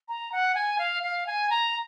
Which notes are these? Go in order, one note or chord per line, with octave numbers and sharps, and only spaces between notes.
A#5
F#5
G#5
F5
F5
G#5
A#5